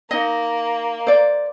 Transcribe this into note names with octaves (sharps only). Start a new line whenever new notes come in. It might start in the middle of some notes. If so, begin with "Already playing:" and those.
A#3 D#4 D#5
C5 D5